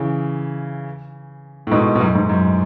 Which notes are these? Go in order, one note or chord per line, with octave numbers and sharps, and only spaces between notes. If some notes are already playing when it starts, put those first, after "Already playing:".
Already playing: C#3 E3
A2
G#2 B2
B2
F#2 A2
G#2
F#2